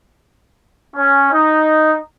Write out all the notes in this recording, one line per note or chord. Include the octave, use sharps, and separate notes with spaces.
C#4
D#4